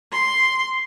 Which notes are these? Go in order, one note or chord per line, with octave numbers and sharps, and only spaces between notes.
C6